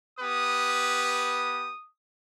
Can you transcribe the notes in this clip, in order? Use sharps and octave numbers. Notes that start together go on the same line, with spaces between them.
B3 G4 B4 D#6